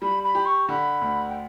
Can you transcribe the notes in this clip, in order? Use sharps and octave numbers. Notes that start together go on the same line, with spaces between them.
G3 B5
B5
G4
C#6
D3 B5
D2
G5